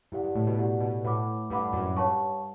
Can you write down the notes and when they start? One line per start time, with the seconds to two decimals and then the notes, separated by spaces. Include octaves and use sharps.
0.12 G2 E4 G4 D5 F#5
0.23 G2
0.35 A2
0.47 B2
0.58 E4 G4 D5 F#5
0.81 B2
1.04 A2 B4 F#5 B5 D6
1.50 G2 B4 F#5 B5 D6
1.73 F#2
1.96 G2 C#5 F#5 A5 C#6